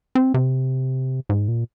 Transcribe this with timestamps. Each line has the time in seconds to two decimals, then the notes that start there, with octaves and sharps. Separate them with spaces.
0.15 C4
0.34 C3
1.29 G#2
1.48 A#2